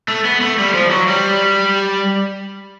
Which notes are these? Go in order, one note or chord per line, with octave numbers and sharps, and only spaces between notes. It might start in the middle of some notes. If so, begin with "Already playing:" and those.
A3
B3
A3
G3
F3
F#3
G3